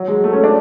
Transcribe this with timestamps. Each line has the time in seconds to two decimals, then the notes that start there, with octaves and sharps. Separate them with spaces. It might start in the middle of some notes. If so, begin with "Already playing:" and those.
Already playing: F#3
0.08 G#3
0.24 A3
0.33 C#4
0.44 D4